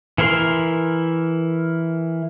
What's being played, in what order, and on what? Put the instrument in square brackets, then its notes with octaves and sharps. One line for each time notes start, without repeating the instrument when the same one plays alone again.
[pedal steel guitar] E3 E4 A#4 C6